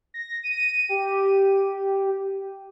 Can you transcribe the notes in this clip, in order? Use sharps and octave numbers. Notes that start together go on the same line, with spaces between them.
A#6
D#7
G4